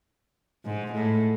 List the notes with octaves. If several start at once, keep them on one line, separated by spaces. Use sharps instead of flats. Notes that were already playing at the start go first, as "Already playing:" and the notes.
G#2
A2